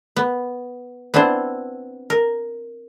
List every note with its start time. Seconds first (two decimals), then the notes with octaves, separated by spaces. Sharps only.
0.16 B3
1.14 B3 C4 D4 E4 C5
2.10 A#4